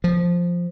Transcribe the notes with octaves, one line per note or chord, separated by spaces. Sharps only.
F3